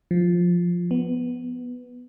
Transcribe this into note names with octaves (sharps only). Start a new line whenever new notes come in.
F3
B3